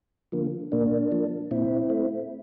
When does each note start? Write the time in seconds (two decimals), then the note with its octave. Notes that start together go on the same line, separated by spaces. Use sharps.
0.32 D3 F3 A#3
0.72 A#2 A#3 D4
1.11 F3 A#3
1.51 A#2 C4 E4
1.90 A3